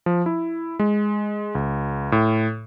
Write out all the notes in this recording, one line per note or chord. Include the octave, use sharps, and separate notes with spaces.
F3
E4
G#3
C#2
A2